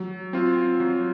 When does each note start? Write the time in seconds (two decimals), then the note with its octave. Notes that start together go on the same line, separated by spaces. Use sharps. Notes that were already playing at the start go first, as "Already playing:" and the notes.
Already playing: F#3
0.33 C4 F4
0.80 F#3